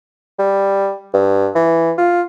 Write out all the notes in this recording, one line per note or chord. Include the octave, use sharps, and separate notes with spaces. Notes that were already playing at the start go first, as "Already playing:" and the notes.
G3
G2
E3
F4